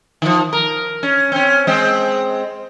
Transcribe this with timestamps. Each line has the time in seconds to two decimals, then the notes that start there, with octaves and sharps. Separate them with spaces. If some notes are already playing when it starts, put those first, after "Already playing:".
0.22 D#3 F3
0.53 A#4
1.03 C#4
1.32 C4 C#4
1.67 G#3 C4